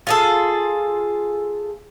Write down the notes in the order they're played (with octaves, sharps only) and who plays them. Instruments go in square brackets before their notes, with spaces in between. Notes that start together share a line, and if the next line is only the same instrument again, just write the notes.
[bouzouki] F4 G#4 A4